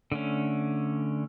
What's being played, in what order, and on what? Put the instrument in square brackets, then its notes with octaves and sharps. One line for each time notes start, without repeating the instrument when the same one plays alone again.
[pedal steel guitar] D3 A3 C#4